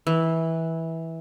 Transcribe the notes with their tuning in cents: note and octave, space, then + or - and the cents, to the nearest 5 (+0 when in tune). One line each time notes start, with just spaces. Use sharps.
E3 -15